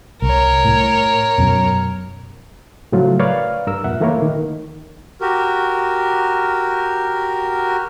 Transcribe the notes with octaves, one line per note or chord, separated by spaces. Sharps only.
C2 A#4 C#5
A2
F#2 B2
A2 C#3 F3 F#3 A3 F4
A#4 B4 C#5 D5 F5
G2 A#4 E6
F2 A#2 E5 F#5
E3 A3 A#3 E4 A#4 C#5
D#3 A#3
F#4 G4 A#4